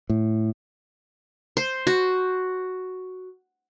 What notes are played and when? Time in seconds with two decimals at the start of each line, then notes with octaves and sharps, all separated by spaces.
0.10 A2
1.57 C5
1.87 F#4